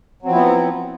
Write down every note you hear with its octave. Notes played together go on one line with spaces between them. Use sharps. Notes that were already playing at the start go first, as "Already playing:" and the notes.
F3 F#3 B3 C4 E4